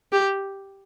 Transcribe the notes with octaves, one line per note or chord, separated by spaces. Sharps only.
G4